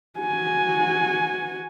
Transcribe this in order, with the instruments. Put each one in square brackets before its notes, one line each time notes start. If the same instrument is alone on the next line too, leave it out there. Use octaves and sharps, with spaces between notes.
[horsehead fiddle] F#4 G#5